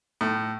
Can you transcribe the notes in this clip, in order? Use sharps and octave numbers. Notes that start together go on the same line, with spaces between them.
A2